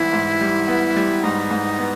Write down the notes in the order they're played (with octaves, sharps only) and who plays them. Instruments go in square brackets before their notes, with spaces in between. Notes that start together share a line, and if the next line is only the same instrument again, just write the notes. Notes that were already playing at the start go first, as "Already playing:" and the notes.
Already playing: [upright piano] G#2 E3 G3 B3 [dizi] E4
[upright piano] G#2
G3
B3
G3
[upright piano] G#2 [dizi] D#4
[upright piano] G#2
B3